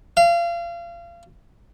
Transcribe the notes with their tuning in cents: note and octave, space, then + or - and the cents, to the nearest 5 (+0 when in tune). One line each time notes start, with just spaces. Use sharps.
F5 -30